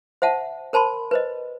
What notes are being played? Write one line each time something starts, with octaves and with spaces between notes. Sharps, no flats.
C5 E5 F#5 A5
A#4 C5 A5 B5 C6
B4 C5 D#5